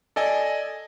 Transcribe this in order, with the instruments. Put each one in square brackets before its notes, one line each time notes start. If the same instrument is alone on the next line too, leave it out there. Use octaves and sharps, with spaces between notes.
[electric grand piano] A4 D5 D#5 G#5